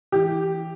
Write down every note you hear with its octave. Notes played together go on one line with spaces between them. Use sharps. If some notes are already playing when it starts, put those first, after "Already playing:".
E3 G4